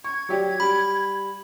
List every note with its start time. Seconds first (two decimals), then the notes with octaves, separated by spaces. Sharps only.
0.04 C#6 G#6
0.29 F#3 G4 D5
0.60 G3 B5